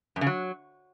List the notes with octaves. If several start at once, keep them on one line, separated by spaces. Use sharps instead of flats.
F#2
C#3
F#3